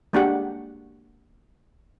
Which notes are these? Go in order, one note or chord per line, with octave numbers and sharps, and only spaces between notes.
G#3 A#3 D4 F#4 G4 F#5